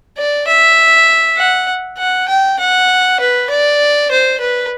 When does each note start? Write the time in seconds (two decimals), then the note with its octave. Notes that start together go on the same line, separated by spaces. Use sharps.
0.17 D5
0.47 E5
1.38 F#5
1.98 F#5
2.29 G5
2.60 F#5
3.20 B4
3.50 D5
4.11 C5
4.41 B4